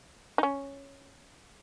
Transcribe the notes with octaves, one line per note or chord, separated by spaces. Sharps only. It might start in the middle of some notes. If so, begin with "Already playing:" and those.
D#4
C#4